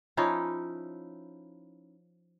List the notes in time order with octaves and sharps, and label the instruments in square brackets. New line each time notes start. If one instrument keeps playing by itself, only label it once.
[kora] F3 C#4 D#4 E4